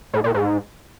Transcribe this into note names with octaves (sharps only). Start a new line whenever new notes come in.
A2
A#2
G#2